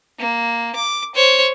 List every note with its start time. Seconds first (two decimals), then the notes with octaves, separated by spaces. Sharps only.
0.18 A#3
0.75 D6
1.14 C5 C#5